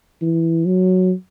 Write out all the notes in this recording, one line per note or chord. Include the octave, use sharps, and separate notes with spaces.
E3
F#3